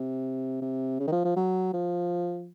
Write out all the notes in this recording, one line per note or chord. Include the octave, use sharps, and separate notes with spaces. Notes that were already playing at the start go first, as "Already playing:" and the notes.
Already playing: C3
C3
C#3
D#3
F3
F3
F#3
F3